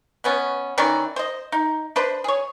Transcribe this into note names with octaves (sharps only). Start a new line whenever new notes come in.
B2 B3 C#4
D#3 E3 C#4 D5
C5 D#5
D#4
D4 B4 C5
G#4 C#5